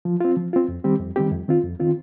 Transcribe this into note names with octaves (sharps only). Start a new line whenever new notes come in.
F3
C4 F4
F3
C4 F4
F2
D#3 G3 C4 G4
F2
D#3 G3 C4 G4
F2
D#3 C4 F4
F2
D#3 C4 F4